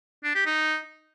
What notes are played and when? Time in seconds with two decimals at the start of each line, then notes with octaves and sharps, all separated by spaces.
0.24 D4
0.35 G4
0.46 D#4